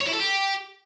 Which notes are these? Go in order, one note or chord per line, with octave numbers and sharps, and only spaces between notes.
C#5
E4
A4
G4